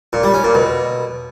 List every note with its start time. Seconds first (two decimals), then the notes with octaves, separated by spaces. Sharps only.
0.13 A#2
0.23 G3
0.34 C#4
0.44 A#2
0.55 B2